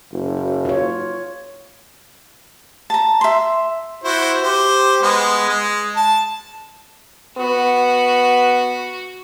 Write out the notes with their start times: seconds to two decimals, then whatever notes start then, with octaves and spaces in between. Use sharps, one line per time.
0.12 F#1
0.65 F4 C#5
2.90 A5 A#5
3.21 E5 C6
4.04 E4 F#4 C5
4.42 G4 C5
5.02 G#3 B3
5.49 G#3
5.96 A5
7.38 B3 F#4